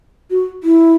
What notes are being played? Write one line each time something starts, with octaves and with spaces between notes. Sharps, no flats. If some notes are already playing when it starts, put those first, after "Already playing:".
F#4
E4